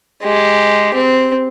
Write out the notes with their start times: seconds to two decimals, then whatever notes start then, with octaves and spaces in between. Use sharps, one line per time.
0.23 G#3 G4
0.94 C4